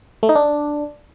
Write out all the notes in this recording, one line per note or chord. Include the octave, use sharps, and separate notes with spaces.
A3
D#4
D4